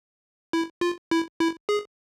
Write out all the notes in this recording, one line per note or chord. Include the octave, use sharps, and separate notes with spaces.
E4
F4
E4
E4
G#4